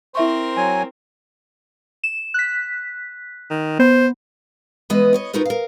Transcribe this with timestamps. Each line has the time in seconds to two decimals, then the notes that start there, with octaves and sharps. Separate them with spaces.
0.15 C4 E4 A#4 C5 E5 C#6
0.57 F#3 G#5
2.04 E7
2.34 F#6 B6
3.50 D#3
3.79 B3 C5
4.90 E3 G#3 B3 D#5
5.13 B3 C#5 D#5
5.33 D#4 F4 F#4 A#4 B4
5.45 A#4 F5